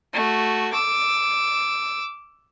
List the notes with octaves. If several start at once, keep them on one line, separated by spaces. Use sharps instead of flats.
A3 F#4
D6 E6